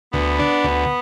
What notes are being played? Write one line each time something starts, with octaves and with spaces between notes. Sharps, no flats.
D2 B3
D4
D2